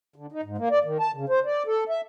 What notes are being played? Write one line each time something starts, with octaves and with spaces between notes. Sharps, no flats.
D3
D#4
G#2
A#3
D5
D#3
A5
C#3
C5
D5
A4
E5